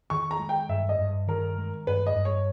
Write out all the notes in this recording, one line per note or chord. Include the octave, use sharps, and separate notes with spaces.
D#3 C#6
A#5
G#3
G5
G2 E5
D#5
G2
D#3 A#4
G#3
G2 B4
D#5
G2
C#5